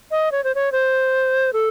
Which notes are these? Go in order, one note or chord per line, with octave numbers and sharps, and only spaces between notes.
D#5
C#5
C5
C#5
C5
A4